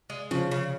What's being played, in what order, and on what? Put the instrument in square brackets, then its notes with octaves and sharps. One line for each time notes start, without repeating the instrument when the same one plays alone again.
[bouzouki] G#3
[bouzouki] C#3 [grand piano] F3
[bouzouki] C#3